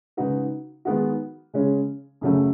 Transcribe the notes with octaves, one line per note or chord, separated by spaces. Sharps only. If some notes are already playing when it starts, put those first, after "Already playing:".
C#3 G#3 D#4 F#4 B4
D#3 G#3 B3 F#4
C#3 G#3 C#4
F#2 C#3 F#3 A3